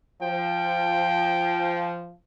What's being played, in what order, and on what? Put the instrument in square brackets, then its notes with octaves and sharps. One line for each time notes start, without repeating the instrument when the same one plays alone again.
[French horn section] F3 [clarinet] G5